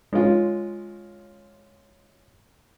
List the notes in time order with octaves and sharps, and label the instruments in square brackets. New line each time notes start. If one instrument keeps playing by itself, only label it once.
[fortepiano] G#3 C#4 F4